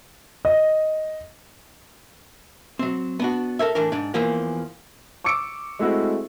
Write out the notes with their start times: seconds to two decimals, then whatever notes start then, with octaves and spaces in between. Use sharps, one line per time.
0.45 D#5
2.79 F#3 C4
3.20 B3 D4 F#4
3.59 A4 A#4 C#5 E5
3.75 A2 E3 D4 A#4
3.92 G#2 D4
4.14 E2 E3 F3 A#3
5.24 C#6 D6 E6 C#7 D7
5.79 G#3 A3 C4 E4 F#4